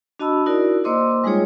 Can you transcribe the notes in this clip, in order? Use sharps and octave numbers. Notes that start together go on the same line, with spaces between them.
D4 F#4 D#5 A5 B5 E6
D#4 E4 F#4 A#4 D5
A#3 C5 D#5 C6 D6 E6
G3 G#3 D#4 F4 G#4 C#5